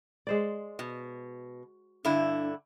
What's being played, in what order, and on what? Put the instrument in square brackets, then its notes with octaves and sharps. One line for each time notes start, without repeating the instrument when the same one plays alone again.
[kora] G#3 C5 D5
[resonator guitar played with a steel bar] B2
[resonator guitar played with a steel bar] G2 D3 E4 [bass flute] D4